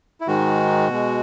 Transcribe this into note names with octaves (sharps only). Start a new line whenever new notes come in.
E4
G#2 D#3 G#3 F#4
B2 G#3